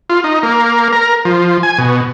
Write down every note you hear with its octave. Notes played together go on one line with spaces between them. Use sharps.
F4
D#4
A#3
A#4
F3
G#5
B2